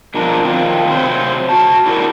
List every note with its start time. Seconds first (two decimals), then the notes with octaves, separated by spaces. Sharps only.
0.14 B2 F3 D4 A#4
0.44 D#3 C4 F4
0.89 C3 F#3 B4 C5
1.49 F#4 A5
1.86 D4 E4 F#4 G4 A#4